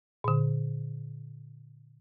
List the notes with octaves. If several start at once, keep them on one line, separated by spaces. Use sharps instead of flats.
A#2 D3